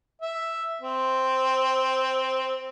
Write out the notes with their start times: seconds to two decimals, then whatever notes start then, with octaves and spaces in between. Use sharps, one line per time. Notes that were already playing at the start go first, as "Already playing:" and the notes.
0.22 E5
0.82 C4